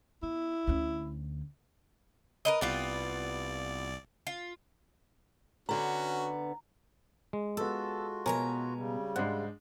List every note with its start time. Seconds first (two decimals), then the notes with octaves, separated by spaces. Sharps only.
0.23 B3 E4
0.67 D2 C#4
2.45 A#4 B4 D#5
2.61 C2 G3 B3 F4 D5
4.27 F4
5.69 D3 B3 C#4 F#4 A#5
7.33 G#3
7.57 B3 F4 F#4 A4 E6
8.26 B2 B3 A#4 C#5 G#5 A#5
8.76 C#3 G3
9.16 G#2 G#3 D4 C5 F#5